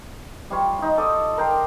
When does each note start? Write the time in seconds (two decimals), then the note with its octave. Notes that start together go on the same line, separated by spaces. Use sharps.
0.50 G3 F4 C#5
0.79 D#4 F4
0.98 A4 D5 D#5
1.38 A#4 G5 A#5 C6